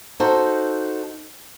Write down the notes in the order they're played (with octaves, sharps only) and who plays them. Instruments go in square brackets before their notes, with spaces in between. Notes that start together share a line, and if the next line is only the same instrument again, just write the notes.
[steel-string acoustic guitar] D#4 F#4 A4 C5